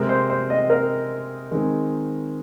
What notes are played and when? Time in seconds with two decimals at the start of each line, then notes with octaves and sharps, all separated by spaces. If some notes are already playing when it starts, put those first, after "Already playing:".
Already playing: C3 G#3 C4 A#4
0.09 C5
0.30 C5
0.50 D#5
0.70 A#4
1.51 D#3 G#3 C4 G#4